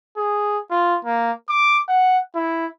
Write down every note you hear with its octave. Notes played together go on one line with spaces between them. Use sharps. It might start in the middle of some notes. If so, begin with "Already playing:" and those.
G#4
F4
A#3
D6
F#5
E4